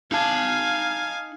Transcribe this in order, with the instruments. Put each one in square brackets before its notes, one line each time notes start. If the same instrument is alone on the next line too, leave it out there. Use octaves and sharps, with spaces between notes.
[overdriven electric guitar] D#4 A5 [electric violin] F5 G#5